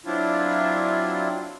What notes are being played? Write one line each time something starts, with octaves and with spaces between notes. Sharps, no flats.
F#3 C4 D4 E4 F4